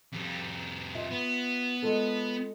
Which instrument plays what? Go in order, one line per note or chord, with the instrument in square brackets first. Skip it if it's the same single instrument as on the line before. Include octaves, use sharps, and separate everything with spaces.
[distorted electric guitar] F2 G3
[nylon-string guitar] F4 E5
[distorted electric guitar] B3
[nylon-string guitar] G#3 F4 A4